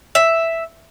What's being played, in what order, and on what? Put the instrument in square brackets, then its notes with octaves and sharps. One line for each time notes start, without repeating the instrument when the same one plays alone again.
[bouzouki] E5